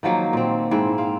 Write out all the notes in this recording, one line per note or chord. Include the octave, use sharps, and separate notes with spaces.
D#3 F3 F#3 A#3
A#2 C4
G#2 C4 E4
C4 F5